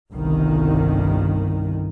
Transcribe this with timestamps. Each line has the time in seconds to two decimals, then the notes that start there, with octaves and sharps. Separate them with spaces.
0.13 G1 C2 D#3